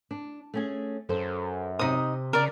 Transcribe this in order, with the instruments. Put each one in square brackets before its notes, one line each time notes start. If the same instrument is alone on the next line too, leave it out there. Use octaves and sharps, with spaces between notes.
[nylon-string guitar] D4
A3 C#4 G#4
[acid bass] F#2 [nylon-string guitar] A4 C5
[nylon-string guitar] C3 C5 [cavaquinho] D#4 D#6
[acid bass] C#3 [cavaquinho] A#4 D5